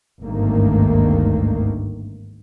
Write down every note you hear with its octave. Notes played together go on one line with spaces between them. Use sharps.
G#1 D2 G2 D#3 A3 A#3